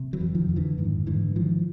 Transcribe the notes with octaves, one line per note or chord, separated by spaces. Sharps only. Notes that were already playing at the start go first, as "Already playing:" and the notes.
Already playing: C3
E3 F#3
F2
D#3 F3
F2
D3 E3
G#2 D#3
G#2 D3 E3
G#2 D#3 F3